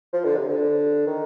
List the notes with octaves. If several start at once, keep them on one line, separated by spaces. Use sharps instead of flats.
F3
D3
C3
D3
D#3